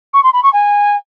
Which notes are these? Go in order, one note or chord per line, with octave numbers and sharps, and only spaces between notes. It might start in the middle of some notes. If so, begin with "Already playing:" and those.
C#6
C6
B5
C#6
G#5